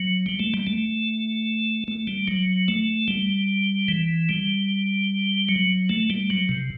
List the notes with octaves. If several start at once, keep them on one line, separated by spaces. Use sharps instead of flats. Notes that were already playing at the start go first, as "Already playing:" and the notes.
Already playing: F#3
G3
A3
G3
A3
A3
G3
F#3
A3
G3
E3
G3
F#3
A3
G3
F#3
C3